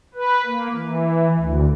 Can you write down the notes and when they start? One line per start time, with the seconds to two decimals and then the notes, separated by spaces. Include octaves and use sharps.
0.14 B4
0.45 A#3
0.74 E3
1.37 D2